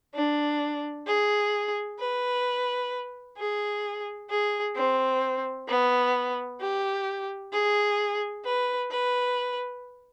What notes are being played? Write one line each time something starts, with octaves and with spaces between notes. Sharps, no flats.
D4
G#4
B4
G#4
G#4
C4
B3
G4
G#4
B4
B4